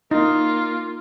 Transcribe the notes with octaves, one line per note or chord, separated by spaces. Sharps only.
A#3 D#4 F4